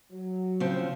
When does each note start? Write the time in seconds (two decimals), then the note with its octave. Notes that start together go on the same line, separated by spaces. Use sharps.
0.12 F#3
0.60 C#3 F3 C4